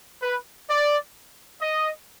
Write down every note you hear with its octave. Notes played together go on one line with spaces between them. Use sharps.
B4
D5
D#5